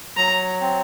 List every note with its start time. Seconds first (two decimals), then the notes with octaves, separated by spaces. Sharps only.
0.17 F#3 A#5
0.61 C4